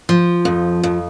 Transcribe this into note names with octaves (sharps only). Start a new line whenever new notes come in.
F3
F2
F2